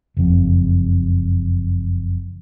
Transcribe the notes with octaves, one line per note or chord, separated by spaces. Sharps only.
F#1 F2